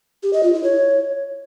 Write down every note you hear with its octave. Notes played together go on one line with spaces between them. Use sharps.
G4
D#5
F4
E4
C#5